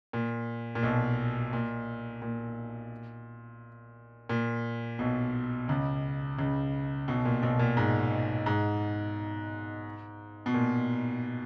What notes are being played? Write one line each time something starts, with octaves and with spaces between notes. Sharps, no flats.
A#2
A#2
B1 B2
A#2
A#2
A#2
B1 B2
C#2 C#3
C#2 C#3
B1 B2
A#2
B1 B2
A#2
G#2
G#2
B2
A#2